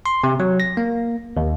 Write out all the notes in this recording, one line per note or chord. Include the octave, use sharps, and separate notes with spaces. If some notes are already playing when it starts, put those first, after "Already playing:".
C6
C3
F#3
A#6
A#3
D#2